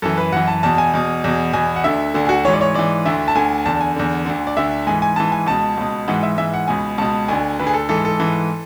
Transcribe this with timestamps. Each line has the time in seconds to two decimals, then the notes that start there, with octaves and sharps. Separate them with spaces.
0.02 F#2 E3 A4
0.18 B4
0.32 F#2 E3 F#5
0.48 A5
0.63 E2 B2 A5
0.78 G#5
0.93 E2 B2
1.24 E2 B2
1.53 E2 B2 G#5
1.76 F#5
1.84 D2 D3 E5
2.14 D2 D3
2.25 G#4
2.29 F#4
2.45 E3 C#5
2.48 G#2 D5
2.61 C#5
2.74 G#2 E3 D5
3.05 D2 D3 E5
3.28 A5
3.35 D2 D3 G#5
3.65 E2 D3 A5
3.81 G#5
3.96 E2 D3
4.25 D2 D3
4.47 D5
4.57 D2 D3 E5
4.87 G#2 E3 G#5
5.02 G#5
5.16 G#2 E3 A5
5.32 G#5
5.46 C#2 B2 A5
5.77 C#2 B2
6.08 G#2 E3 F#5
6.23 E5
6.38 G#2 E3 E5
6.53 F#5
6.68 C#2 B2 G#5
6.98 C#2 B2 A5
7.28 D2 D3 G#5
7.59 D2 D3 B4
7.67 G#4
7.74 A4
7.89 G#2 E3 A4
8.05 A4
8.20 G#2 E3